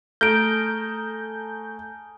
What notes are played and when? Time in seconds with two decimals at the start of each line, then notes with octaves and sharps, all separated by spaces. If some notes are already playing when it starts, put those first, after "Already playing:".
0.21 A3 G#4 A5 A#5 F6 G6 D7